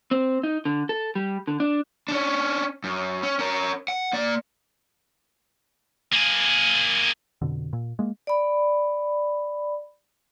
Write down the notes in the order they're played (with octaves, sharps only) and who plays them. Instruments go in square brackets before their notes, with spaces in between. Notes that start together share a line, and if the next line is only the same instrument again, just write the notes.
[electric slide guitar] C4
D#4
D3
A4
G3
D3
D4
[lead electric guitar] C#4 D4
F#2
C#4
C#4 A#4
F#5
A#3 D5
[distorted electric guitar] A#3 G#4
[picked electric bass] F2 B2 D3
A#2
G#3 A#3
[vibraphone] D5 B5